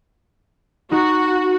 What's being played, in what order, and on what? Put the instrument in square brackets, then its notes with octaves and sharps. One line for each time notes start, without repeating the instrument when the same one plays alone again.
[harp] D#4 A#5 C#7 [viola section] F#4